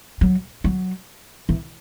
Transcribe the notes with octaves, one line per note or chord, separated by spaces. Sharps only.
F#3
F#3
E3